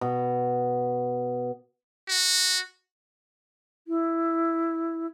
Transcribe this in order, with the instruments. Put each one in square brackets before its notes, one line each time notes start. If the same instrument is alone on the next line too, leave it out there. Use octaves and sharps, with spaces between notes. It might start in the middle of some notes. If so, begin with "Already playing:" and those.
[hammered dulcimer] B2
[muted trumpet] F#4
[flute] E4